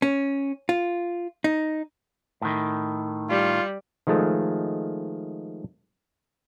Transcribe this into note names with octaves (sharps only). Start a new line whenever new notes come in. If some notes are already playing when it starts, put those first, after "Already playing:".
C#4
F4
D#4
A2 D#3
G3 F4
D#3 F3 G#3 A3